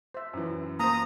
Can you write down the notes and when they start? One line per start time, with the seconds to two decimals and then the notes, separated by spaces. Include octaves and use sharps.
0.14 C5 E5
0.33 F#2 E3
0.80 A#3 C5 A#5 D#6